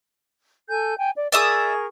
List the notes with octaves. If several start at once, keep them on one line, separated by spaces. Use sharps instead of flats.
A4 G#5 G6
G5 G#5
D5
G#4 A#4 D5 E5 C#6 D#6